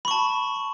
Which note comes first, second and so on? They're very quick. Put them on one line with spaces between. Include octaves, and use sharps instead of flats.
B5 C#6 A5